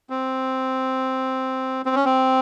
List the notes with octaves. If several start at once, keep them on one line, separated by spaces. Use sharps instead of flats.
C4
C4
C#4
C4